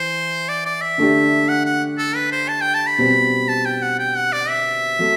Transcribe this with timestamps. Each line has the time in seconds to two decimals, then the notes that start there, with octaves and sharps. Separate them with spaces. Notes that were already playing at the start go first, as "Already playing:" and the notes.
Already playing: E3 C5
0.49 D5
0.66 D5
0.81 E5
0.98 D3 A3 D4 G4
1.49 F#5
1.66 F#5
1.98 A4
2.15 B4
2.32 C5
2.49 A5
2.61 G5
2.74 A5
2.87 B5
2.98 B2 G3 C4
3.49 A5
3.66 G5
3.82 F#5
3.99 G5
4.16 F#5
4.33 D5
4.49 E5
4.99 F#3 A3